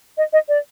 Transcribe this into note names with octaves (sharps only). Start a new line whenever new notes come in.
D#5
D#5
D5